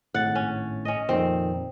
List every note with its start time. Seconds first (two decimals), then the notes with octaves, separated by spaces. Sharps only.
0.14 G#1 A2 F#5 A6
0.35 C#4
0.85 C#4 D#5
1.09 F2 A#2 D#3 C4